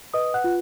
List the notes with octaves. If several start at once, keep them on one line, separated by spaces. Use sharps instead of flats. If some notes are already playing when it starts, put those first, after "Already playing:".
B4 D#5 D#6
F#5 F#6
F4